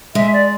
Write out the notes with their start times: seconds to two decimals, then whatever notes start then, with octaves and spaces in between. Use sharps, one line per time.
0.15 G#3 E5
0.33 D5